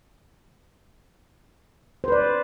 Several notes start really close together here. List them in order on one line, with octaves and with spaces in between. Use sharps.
C5 B4 D5